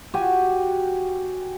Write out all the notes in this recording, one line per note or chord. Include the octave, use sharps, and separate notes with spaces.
F#4 G4 F#5 G#5